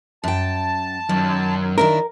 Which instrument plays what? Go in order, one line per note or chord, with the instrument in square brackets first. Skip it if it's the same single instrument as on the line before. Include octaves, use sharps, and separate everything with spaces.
[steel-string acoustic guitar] F#2 G5 [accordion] A5
[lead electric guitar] F#2 [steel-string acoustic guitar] D#3
[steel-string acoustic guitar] D#3 D4 E4 [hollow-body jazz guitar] A#4